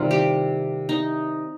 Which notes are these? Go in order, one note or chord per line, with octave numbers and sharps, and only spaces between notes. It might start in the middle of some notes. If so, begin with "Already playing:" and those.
Already playing: C3 D#3 G3 C4 F4
G4
D#4